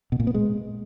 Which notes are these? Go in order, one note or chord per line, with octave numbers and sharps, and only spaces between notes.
B2
A#2
B3
G#3